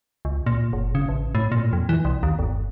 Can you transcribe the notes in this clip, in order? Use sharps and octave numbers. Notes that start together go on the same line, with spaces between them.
C#2
A#2
F#1
C#3
A1
A2
A#2
F2
E3
C2
D#2
G1